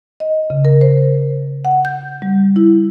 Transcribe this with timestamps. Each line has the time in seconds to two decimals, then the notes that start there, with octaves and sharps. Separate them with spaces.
0.20 D#5
0.50 C#3
0.65 A#4
0.81 C5
1.65 F#5
1.85 G6
2.22 G3
2.56 E4